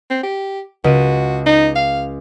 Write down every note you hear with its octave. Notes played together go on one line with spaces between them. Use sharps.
C4
G4
C#2 F#4 D#7
D#4
F5